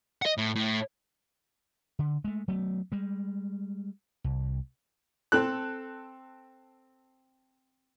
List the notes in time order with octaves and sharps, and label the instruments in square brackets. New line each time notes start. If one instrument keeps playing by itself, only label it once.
[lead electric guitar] D#5 F#5
A2
A2
[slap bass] D3
G#3 A3
F#3 A3 B3
G3 G#3
C2
[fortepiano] C4 A4 F#6